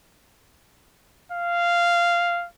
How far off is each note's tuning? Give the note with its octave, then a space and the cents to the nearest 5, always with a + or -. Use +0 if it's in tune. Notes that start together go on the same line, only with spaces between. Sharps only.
F5 -10